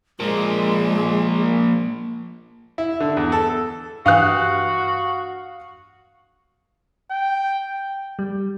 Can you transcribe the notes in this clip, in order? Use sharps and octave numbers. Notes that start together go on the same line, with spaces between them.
F3 G#3 A#3
E4
D3
E2
A4
G2 E3 F#4 F5 D#6 F#6
G5
G3